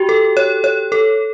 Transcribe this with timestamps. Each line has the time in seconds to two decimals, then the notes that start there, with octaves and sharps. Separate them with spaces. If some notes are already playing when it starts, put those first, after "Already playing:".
Already playing: F#4 G4
0.09 A4
0.37 C#5
0.64 C#5
0.92 A4